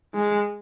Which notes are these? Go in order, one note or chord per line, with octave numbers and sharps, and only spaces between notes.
G#3